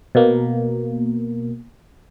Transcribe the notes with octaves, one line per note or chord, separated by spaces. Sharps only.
B2 A#3